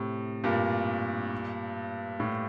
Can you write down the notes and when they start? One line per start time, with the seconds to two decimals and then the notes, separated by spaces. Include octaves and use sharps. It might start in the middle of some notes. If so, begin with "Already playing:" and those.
Already playing: A2 C3
0.44 G2 A#2
2.20 A2